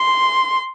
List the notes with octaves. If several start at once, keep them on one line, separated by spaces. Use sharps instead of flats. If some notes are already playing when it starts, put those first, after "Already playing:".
Already playing: C6